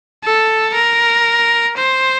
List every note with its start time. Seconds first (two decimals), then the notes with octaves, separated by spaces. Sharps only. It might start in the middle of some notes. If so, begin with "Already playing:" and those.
0.24 A4
0.75 A#4
1.77 C5